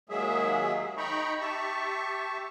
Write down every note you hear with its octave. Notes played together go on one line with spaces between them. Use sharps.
D#2 F#3 G#3 A#3 G#4 E5
D#4 G5 A#5 B5 C#6
G4 E5 A5 C#6